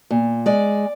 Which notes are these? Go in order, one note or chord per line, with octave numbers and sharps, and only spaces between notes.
A#2
G#3 D5